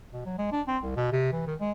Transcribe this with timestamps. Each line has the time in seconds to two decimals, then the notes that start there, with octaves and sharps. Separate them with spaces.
0.13 B2
0.26 F#3
0.38 G#3
0.52 D4
0.68 C4
0.83 C2
0.96 B2
1.12 C3
1.33 E3
1.47 D#3
1.60 G#3